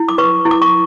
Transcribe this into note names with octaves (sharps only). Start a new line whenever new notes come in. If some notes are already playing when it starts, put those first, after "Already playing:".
Already playing: E4
D6
B4 C#6
E4
D6
C#6